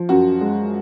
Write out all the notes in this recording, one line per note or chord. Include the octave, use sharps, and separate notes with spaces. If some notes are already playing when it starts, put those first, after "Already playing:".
Already playing: F3
F#2 F#4
G#3